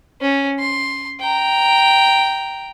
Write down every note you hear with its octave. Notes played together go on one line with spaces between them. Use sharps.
C#4
C6
G5 A#5